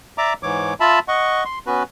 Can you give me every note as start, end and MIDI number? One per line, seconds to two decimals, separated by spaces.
0.18 0.34 74
0.18 0.34 76
0.18 0.34 82
0.18 0.34 86
0.43 0.74 44
0.43 0.74 52
0.43 0.74 73
0.43 0.74 86
0.80 0.99 65
0.80 0.99 76
0.80 0.99 81
0.80 0.99 83
1.08 1.44 75
1.08 1.44 78
1.08 1.44 85
1.45 1.59 84
1.67 1.83 59
1.67 1.83 61
1.67 1.83 66
1.67 1.83 71